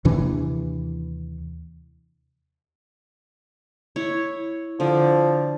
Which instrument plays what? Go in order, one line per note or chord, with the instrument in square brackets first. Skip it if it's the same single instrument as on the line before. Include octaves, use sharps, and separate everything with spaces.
[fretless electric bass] D#2 C3 E3 D4
[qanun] E4 C#5
[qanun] D3 [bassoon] F3